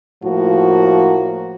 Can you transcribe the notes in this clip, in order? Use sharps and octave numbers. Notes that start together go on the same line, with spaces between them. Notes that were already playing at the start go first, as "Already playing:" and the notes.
A2 F3 A#3 F#4